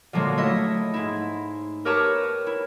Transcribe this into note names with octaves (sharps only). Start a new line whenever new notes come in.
A#2 D3 F3 F#3 G#3
A3 E4 D#5 E5
G#2 E4
G4 A#4 B4 C#5 A5 A#5
E4